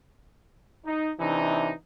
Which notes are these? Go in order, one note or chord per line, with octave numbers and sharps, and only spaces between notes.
D#4
C3 E3 D4 D#4